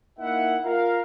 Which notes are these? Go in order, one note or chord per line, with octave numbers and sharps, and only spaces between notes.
A#3 D#4 E4 E5 F#5
F4 A#4 F5